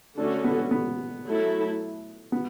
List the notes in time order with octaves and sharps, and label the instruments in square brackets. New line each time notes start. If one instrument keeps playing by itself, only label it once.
[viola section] D3 A3 C#4 F#4 A4 [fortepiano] D4
[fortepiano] B3
B3
[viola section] F#3 A3 E4 A4
[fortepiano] B3